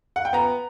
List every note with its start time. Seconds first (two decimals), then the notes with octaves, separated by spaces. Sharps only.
0.16 F#5
0.25 G5
0.33 B3 A#5